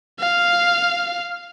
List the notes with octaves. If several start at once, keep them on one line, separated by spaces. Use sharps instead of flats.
F5